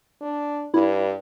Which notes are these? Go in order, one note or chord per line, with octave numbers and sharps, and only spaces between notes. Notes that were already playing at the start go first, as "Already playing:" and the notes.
D4
G2 E4